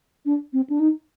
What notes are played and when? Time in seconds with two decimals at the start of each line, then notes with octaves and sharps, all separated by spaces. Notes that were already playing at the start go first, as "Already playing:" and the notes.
0.26 D4
0.53 C4
0.70 D4
0.80 D#4